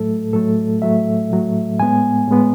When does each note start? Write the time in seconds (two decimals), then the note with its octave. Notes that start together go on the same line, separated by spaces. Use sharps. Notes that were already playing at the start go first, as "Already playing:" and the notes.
Already playing: A2 F#3 A3 A4
0.33 A2 F#3 A3 A4
0.82 A2 F#3 A3 E5
1.32 A2 F#3 A3
1.80 A2 G#3 B3 G#5
2.28 A2 G#3 B3